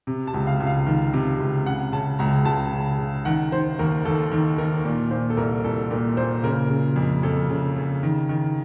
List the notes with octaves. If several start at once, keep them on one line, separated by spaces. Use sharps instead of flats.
C3
A5
C#2
F5
C#2
F5
D#3
C3
C#2
C#3 F#5
C#3 A5
C#2 A#5
C#2 A5
C#3
C#3
D#3 F#5
D#3 C5
D#2 A#4
D#2 A4
D#3
D#3 A#4
A#2
A#2 C5
A4
C2 A#4
C2 A4
A#2 A#4
A#2 C5
C#3 A#4
C#3
F2
F2 A4
C#3
C#3
D#3
D#3